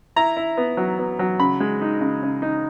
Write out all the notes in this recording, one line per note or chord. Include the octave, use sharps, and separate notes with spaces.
E4 A#5
E4
B3
F#3
B3
F#3
C#3 B5
G#3
D#4
C#3
C#3
D#4